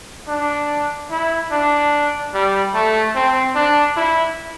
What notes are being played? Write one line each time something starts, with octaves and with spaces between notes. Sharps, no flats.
D4
E4
D4
G3
A3
C4
D4
E4